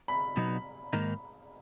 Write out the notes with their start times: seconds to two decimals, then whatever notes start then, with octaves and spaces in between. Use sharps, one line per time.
0.08 B5
0.37 B2 F#3 B3 D#4
0.93 G#2 D#3 A#3 D#4